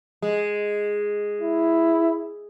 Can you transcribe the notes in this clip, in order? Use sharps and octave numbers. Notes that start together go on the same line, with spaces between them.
G#3
E4